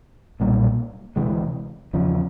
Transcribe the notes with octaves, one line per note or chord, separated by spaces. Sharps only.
B1 A#2 G3 A#3
D2 C3 E3 G#3
E2 C#3 F3